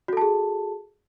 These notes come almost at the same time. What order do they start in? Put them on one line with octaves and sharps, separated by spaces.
F#4 A4 A5 G#4